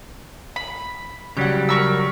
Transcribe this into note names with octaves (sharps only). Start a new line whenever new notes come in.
B5
C#3 F#3 G3 G4 F#5
A#4 C#6 E6